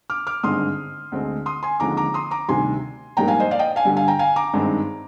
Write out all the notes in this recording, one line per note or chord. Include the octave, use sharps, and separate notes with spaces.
D6 F6
D6 F6
G#1 G2 D3 G#3 C4 C6 D#6
D2 D3 G#3 C4
C6 D#6
G#5 C6
D#2 D3 F3 G#3 C4 A#5 D6
A#5 D6
C6 D#6
A#5 D6
D2 C3 D#3 G3 G#5 C6
A#1 G#2 G3 A#3 G5 A#5
F5 G#5
C5 D#5
D5 F5
D#5 G5
F5 G#5
G2 D3 G3
F5 G#5
G5 A#5
F5 G#5
A#5 D6
G#1 G2 D#3 G#3 C4